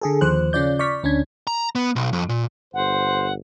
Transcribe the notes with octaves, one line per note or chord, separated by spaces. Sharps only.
D3 G#4 A4
D#2 F3 C5 F#6
C#3 C#4 F4 D5 G6
D5 C#6 F6 B6
D2 C#4 D4 G#6
A#5
B3
B1
F2
A#2
G1 C5 F#5